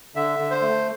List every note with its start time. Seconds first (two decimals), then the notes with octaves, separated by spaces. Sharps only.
0.15 D3 E5
0.39 D3
0.51 C5
0.62 A3